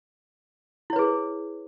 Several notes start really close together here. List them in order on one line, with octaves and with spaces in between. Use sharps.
E4 C#5 B4 G#4